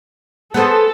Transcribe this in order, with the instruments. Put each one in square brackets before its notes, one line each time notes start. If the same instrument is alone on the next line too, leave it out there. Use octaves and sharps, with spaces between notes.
[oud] B3 G#4 C5 [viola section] A4